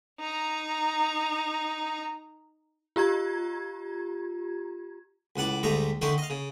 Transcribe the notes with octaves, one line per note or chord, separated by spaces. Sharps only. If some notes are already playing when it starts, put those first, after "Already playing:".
D#4 A#5
F4 G4 A#5 G#6
C#2 A2 F#5 A5 D6
D2 G#2 G3 A3 A#5 D#6
D3 D#3 A3 G5 C6 C#6
D#5 F5
C#3